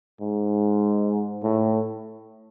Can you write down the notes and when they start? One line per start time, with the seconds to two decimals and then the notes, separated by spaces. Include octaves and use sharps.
0.21 G#2
1.43 A2